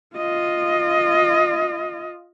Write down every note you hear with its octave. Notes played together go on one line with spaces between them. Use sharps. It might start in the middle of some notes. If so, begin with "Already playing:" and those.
F4 D#5